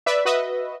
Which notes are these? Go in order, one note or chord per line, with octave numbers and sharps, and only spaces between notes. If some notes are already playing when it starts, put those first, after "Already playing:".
B4 D5 E5
F#4 B4 D#5 E5